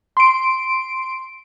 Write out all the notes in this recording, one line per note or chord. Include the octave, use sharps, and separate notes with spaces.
C6 D7